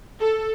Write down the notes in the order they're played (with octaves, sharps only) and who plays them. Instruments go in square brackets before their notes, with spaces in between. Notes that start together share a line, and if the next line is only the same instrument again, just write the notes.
[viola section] A4